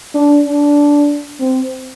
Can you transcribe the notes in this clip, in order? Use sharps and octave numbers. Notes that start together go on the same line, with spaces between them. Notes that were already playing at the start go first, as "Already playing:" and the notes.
D4
D4
C4